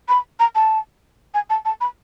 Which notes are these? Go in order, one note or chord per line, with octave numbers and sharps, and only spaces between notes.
B5
A#5
A5
G#5
A5
A5
B5